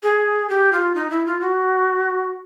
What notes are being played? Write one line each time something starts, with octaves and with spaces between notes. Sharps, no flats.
G#4
G4
F4
D#4
E4
F4
F#4